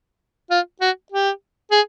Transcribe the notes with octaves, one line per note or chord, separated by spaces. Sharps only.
F4
F#4
G4
G#4